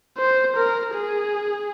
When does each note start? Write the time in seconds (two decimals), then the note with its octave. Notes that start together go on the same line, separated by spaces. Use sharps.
0.18 C5
0.56 A#4
0.95 G#4